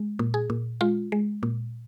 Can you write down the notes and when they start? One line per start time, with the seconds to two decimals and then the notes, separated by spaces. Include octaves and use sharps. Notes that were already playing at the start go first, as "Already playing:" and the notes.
Already playing: G#3
0.19 A#2
0.34 G#4
0.50 A#2
0.81 G#3 F4
1.12 G#3
1.43 A#2